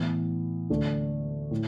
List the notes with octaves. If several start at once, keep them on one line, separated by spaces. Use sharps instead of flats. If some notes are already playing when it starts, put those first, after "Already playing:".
Already playing: A2 E3 B3
D2 D3 A3 D4
A2